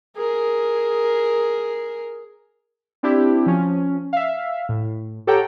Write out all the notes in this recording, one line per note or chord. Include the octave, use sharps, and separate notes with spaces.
G#4 A#4
C4 D4 E4 G4
F3 C#4
E5 F5
A2
G4 A4 C#5 F#5 G5 A#5